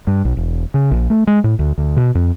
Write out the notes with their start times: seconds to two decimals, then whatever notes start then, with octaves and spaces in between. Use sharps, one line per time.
0.07 G2
0.25 B1
0.37 E1
0.74 C#3
0.91 A#1
1.10 A3
1.27 G#3
1.44 A2
1.59 D2
1.78 D2
1.97 B2
2.15 F2